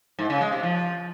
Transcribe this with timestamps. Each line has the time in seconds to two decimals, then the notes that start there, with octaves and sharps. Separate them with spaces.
0.19 G#2
0.30 C#3
0.41 G#3
0.52 C3
0.63 F3